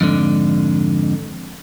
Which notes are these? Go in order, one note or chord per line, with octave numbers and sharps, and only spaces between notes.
F2 G#2 D3